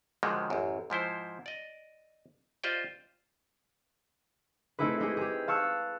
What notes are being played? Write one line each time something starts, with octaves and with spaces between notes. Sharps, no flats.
G#2 D3 D#3 F3 F#3 G#3
A1 F#2
G#2 F3 E4 C5
D5 D#5
F4 G4 C5 D5 D#5 G5
A3 C4 D#4 E4 G#4 B4
G#3 D#4 E4 G4 G#4
G4 G#4
F5 A5 C#6 E6 F#6